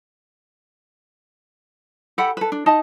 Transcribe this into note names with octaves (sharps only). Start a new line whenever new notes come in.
G4 A4 F#5 B5
A4 B4
D4
D#4 D#5 A5